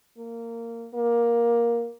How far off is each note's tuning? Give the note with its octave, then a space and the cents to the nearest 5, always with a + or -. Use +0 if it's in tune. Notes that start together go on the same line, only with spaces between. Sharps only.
A#3 -15
A#3 +10